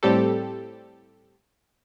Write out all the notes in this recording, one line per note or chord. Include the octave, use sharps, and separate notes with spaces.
A2 G3 C4 G4 A4